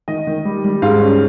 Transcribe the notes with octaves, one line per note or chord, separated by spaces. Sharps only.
D#3 D#5
D#3
G3
G3
G#2 F5
C#4